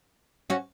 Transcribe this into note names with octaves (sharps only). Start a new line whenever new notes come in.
C#4 F#4